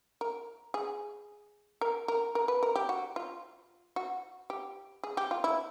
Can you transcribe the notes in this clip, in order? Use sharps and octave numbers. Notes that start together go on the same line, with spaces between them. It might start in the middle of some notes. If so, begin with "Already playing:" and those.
A#4
G#4
A#4
A#4
A#4
B4
A#4
G4
F#4
F4
F#4
G4
G#4
G4
F4
E4